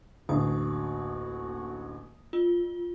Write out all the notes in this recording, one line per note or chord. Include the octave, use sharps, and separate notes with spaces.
A1 D2 A#3 F#4 D#6
F4